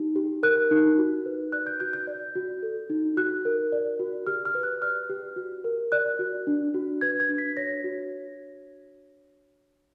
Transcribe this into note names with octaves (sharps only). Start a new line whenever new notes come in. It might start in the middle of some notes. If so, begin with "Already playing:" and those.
Already playing: D#4 G4
G4
A#4 F#6
D#4
F#4
B4
D5 F#6
G6
F#4 G6
G6
D5
F#4
A4
D#4
F#4 F#6
A#4
D5
F#4
G4 F6
F6
B4
F#6
D5 F6
G4
F#4
A#4
D5 F#6
F#4
D4
F#4
B4 G#6
G#6
D4
B6
C#5 A#6
F#4